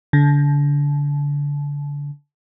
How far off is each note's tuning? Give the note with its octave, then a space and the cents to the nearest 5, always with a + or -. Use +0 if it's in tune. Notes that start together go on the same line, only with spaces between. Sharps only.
D3 -30